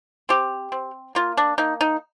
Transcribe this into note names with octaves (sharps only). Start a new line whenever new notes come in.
C4 G4
C4
A#3 F4
D4
A#3 D#4
D#4